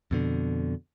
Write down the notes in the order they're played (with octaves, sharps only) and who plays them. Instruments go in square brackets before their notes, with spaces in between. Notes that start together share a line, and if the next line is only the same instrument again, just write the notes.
[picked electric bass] F2 B2 D3